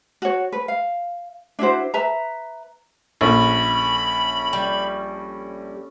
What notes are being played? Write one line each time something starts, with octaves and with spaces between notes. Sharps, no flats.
F#4 C#5
B4
F5
D4 E4 F#4 C5
B4 E5 A#5
A#1 C#4 A4 B4 B5
G3